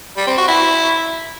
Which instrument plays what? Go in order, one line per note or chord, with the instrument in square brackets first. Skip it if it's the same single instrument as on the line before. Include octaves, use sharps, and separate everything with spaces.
[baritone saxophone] G3
C4
F#4
E4